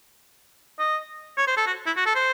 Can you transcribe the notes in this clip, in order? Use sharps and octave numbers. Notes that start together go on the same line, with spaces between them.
D#5
C#5
C5
A4
F#4
E4
F#4
A4
C5